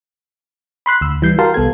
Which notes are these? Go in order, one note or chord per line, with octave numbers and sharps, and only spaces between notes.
B5 C6 F#6 B6
D2 E6
E3 G3 G6 C7
F#4 G4 A#4 F5 A5 C6
C2 B3 A4 G#6